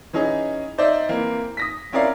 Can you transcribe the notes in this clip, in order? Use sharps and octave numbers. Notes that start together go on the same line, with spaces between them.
E3 C#4 D#4 G#4
D#4 C5 D5 E5
E3 A#3 C4
D#6 A#6 B6
C4 C#4 E4 A#4 D5 F5